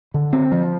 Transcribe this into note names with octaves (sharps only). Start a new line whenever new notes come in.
D3
C4
F3